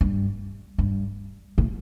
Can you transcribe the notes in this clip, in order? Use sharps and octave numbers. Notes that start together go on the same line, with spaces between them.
G2
G2
A2